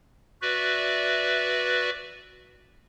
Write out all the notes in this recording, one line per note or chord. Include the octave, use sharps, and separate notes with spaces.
F#4 B4 D5 E5